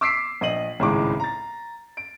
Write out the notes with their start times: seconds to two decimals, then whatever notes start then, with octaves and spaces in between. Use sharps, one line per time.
0.01 D6 E6 B6 C7 D7
0.41 A#1 D#5 D#7 F#7
0.80 G#1 C#2 A2 G#3 D6
1.20 A#5 A6
1.97 D7